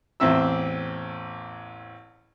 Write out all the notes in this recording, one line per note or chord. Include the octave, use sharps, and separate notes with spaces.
A1 E2 C4 E5 E6